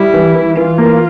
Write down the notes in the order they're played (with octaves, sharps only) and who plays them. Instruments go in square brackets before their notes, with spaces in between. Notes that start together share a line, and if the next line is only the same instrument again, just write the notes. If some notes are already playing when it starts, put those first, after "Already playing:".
Already playing: [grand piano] G3 [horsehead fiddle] E4
[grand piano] E3
E3
[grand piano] E3 [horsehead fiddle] F4
[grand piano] A#3